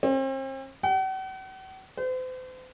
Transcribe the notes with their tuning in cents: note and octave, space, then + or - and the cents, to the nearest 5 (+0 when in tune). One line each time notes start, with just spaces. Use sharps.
C4 +40
F#5 +45
C5 -40